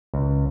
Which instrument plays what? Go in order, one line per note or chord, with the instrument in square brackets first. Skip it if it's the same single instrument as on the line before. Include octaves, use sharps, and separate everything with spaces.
[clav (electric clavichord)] C#2